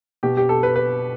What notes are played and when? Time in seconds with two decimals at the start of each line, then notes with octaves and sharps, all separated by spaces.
0.23 B2 G4
0.37 G4
0.49 A4
0.63 B4
0.76 B4